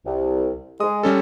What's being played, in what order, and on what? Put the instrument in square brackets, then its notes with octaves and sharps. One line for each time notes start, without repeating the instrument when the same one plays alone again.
[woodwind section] C2
[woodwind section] G#3 [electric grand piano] D#6
[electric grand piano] G3 C#4 A4